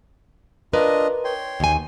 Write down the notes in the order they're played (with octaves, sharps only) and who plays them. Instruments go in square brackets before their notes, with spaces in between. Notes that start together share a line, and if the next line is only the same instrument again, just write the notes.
[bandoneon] D4 F4 D#5 [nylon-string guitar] A#4 B4
[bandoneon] C#5 G5 C6
[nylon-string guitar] D#2 G#5